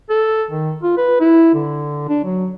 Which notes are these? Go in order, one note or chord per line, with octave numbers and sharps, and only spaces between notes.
A4
D#3
F4
B4
E4
D3
D4
F#3